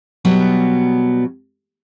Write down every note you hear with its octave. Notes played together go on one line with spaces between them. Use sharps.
B2 F#3 G3 B3